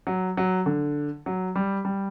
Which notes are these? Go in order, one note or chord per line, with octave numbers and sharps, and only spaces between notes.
F#3
F#3
D3
F#3
G3
G3